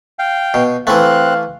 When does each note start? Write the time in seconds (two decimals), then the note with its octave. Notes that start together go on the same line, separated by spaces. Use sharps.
0.19 F5 G5
0.54 B2
0.87 E3 A3 C4 F5 F#6